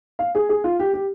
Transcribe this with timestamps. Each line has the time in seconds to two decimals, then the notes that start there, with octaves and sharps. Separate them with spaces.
0.19 F5
0.35 G#4
0.49 G#4
0.64 F4
0.79 G4
0.93 G4